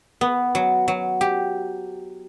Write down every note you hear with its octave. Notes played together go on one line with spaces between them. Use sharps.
B3
F#3
F#3
G4